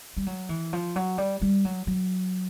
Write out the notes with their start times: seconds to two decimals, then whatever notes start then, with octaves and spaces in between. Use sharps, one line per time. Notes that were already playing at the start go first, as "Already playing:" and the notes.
0.17 G3
0.27 F#3
0.49 E3
0.73 F3
0.96 F#3
1.18 G3
1.42 G3
1.65 F#3
1.87 F#3